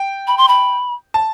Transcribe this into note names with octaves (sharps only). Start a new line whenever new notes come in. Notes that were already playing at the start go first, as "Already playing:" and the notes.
Already playing: G5
B5
C6
B5
A5